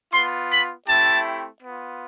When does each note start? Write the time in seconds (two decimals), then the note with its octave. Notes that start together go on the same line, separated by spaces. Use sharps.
0.13 B3 F4 C6
0.51 B5
0.87 A3 C4 E4 G4 A5
1.62 B3 F4